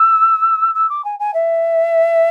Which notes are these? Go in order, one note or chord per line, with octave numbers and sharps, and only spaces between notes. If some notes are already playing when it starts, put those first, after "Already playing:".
Already playing: E6
E6
D6
G#5
G#5
E5